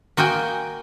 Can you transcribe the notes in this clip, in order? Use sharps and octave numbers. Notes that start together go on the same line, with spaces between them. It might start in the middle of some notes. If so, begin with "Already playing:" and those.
A#3 F#4 D#5 G5 G#5